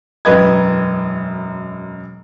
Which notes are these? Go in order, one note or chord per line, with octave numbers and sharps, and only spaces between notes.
E1 F#2 B4 D#5 G#6